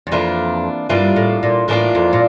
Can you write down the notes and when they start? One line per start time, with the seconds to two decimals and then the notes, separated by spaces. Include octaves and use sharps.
0.07 E2
0.12 F2 E3 A#3 D4 F4
0.89 G2 E3 A#3 D4 F4
1.16 A2
1.43 A#2
1.68 A2 E3 A#3 D4 F4
1.95 F2
2.13 A#2